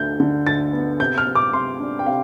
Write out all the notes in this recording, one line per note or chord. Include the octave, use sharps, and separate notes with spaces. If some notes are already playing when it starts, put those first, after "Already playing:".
Already playing: D2 D3 G6
D3
D2 A6
B3
C3 G6
F6
C3
D6
C3 C6
D4
G5
C3 F5